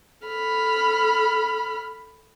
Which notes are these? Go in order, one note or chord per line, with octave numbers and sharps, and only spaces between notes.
A4 B5 F6